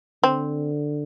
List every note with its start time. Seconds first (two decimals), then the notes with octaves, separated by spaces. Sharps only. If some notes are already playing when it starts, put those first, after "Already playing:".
0.23 D3 C4